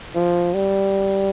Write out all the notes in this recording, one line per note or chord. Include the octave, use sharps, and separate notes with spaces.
F3
G3